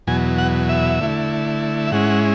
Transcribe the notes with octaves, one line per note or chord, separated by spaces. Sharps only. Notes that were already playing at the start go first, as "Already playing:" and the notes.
E2 B2 F#3 G#5
F#5
E5
D3 A3 E4
E5
G#2 G#3 C#4 E4 F#5